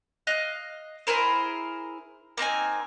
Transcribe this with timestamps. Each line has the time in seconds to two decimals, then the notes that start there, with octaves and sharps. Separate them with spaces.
0.27 D#5 F5 F#6
1.07 E4 G#4 A#4 C5
2.37 A#3 C4 D#4 G#5